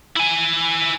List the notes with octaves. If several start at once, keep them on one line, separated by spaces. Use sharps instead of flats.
E4 G#5